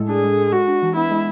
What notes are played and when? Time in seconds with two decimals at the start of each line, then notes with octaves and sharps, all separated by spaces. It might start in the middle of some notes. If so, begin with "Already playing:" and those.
Already playing: A2 G#3 A4
0.08 D4 G#4
0.24 G#3
0.37 A4
0.52 G#3 F#4
0.68 D4
0.82 E3
0.96 B3 E4
1.10 G#3